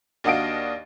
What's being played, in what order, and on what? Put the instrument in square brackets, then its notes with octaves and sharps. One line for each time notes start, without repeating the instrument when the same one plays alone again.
[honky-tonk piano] D#2 D4 F#4 D#5 F5 D7